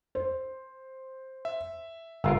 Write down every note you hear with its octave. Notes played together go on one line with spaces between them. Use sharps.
C5
E5
G1 F4 A#4 E6